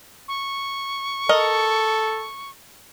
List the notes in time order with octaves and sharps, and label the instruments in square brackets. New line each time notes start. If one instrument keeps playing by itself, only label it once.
[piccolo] C#6
[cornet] A4 [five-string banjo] A#4 D#5